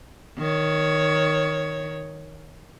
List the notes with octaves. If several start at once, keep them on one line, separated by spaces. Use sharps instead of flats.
D#3 C#5